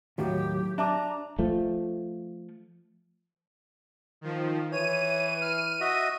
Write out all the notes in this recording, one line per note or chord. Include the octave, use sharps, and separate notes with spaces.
D#2 A2 D#3 F#3 G4
D4 E5 A5 A#5 D6
F3 A3
D#3 F3
E3 C#5 D#7
F6
F#4 D#5 E5